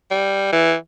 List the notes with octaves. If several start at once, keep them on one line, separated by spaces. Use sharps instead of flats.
G3
E3